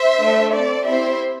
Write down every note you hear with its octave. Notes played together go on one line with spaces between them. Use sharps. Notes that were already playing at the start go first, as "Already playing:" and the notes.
Already playing: C5 E5
A3 D4 A4
C4 A4 D5
C4 E4 G4 C5 E5